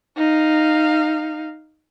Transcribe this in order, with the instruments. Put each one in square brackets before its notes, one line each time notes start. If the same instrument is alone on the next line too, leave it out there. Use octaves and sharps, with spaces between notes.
[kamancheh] D#4 F5